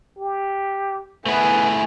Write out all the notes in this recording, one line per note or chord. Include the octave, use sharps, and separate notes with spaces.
G4
A3 B3 E4 G#4 G#5